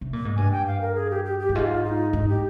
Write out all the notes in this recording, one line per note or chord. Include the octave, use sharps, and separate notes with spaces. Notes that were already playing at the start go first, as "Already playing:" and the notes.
C3
A#2
G#2
G2 G#5
G5
F5
A#4
G#4
G4
G4
G4
G2
G#2 F4
D#4
G#2 D#4
G4